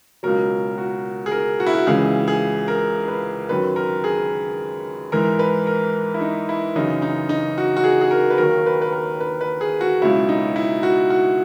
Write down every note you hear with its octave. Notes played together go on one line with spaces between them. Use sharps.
C#2 B2 F#3 A#4
F#4
G#4
A#4
F#4
E4
F#4
C#2 C#3 E3 G#4
G#4
A#4
B4
F#2 D#3 F#3 B4
A#4
G#4
G#2 E3 A#4
B4
A#4
E4
D#4
E4
F#2 C#3 E3 D#4
D#4
D#4
F#4
F#4
G#4
G#4
A#4
B4
D#2 D#3 F#3 A#4
B4
B4
A#4
B4
B4
G#4
F#4
C#2 B2 F#3 E4
D#4
E4
F#4
F#4